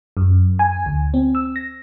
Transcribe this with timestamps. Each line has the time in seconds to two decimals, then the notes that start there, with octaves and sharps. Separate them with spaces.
0.17 F#2
0.59 G#5
0.86 D2
1.14 C4
1.35 E6
1.56 A#6